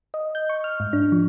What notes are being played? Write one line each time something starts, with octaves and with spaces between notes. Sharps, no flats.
D#5
G6
C#6
F6
G#2
D4
F3